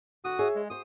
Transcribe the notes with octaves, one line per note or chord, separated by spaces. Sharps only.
D3 F#4 D#6
G#4 C#5 E5
G#3
F#4 C5 D#6